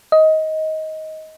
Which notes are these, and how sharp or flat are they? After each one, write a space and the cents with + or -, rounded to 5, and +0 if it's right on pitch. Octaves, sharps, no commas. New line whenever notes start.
D#5 +15